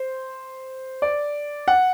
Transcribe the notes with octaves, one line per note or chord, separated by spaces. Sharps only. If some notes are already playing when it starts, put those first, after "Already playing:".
Already playing: C5
D5
F#5